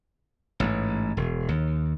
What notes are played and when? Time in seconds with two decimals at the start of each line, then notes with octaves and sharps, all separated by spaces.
0.60 A1 G#2
1.17 E1
1.49 D#2